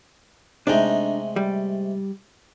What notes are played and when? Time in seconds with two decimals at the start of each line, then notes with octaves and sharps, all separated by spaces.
0.67 C3 G#3 A3 D4 D#4
1.36 G3